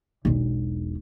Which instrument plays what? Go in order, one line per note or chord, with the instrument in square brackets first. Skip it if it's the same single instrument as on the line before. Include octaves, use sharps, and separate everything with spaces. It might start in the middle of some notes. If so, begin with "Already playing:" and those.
[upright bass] E1 B1